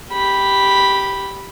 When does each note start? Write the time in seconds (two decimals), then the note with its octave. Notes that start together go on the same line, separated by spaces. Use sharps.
0.12 G4 B5